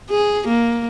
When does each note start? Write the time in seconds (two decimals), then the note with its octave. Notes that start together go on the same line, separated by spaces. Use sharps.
0.10 G#4
0.48 A#3